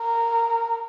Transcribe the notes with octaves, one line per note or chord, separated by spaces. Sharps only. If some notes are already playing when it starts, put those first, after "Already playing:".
Already playing: A#4